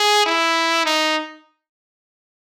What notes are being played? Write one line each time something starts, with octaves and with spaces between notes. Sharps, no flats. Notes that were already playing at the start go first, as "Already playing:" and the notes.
Already playing: G#4
E4
D#4